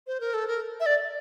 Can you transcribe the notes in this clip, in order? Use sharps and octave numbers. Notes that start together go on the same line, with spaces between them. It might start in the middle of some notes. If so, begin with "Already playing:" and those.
C5
A#4
A4
A#4
E5
D5